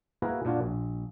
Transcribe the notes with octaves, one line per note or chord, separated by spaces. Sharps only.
A#3 E4 F#4 G#4 A#4 B4
A#2 D4 F4 F#4
A#1